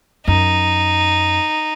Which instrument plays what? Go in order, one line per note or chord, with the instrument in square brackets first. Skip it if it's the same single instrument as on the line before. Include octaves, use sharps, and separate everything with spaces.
[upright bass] F#2 [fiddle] D#4